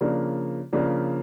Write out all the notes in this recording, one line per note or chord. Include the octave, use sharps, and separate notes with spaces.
C#3 F3 A#3 D4
C#3 F3 A#3 D4